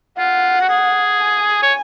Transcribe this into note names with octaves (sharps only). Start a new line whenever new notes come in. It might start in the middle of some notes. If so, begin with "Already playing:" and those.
F4 F#5
F#4
G#4
G#5
C#5